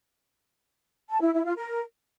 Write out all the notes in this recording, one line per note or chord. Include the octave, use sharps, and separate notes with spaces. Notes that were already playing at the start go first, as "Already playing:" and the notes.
A5
E4
E4
F4
A#4